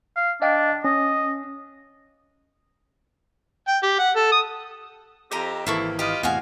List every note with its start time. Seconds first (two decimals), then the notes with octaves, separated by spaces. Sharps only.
0.16 F5
0.42 D4 D#5 F5 G5
0.84 C#4 D#5
3.68 G5
3.83 G4
3.99 F#5
4.16 A4
4.32 D#6
5.32 F2 C4 G4 D#5 A#5
5.67 G#1 C3 E3 A#3 E4 A4 C#6
5.99 F4 G4 B4 D#5
6.23 E2 A2 C3 F#4 F5 G#5